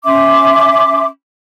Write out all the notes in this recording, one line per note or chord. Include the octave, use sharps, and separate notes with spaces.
C#4 E5 C6 D6